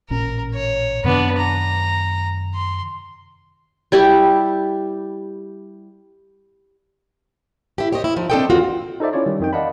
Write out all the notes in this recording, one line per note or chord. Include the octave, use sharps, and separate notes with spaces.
A1 A#2 C#4 A#4
C#5
F#2 C3 D#3 B3 D4
A#5
C6
G3 E4 G4
E4 G4
G4 C5 C#5 D#5
E4
F3 D#4
C4 D4 E4 A4 D#5 G5
E2 F4 F#4
D#4 A4 C5 D5 E5
C#4 E4 F4 C#5 D5
D#3 G3
F2 D#3 G5
D5 D#5 F5 F#5 A5 B5